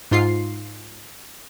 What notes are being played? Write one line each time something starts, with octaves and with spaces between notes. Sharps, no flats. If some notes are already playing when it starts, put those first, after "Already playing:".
G#2 F4 C7